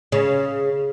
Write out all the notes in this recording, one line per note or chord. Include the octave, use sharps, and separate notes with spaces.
C#3